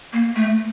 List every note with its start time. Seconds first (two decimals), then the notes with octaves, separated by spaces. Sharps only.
0.13 A#3
0.36 A3